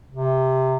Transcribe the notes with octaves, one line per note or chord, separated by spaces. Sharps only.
C3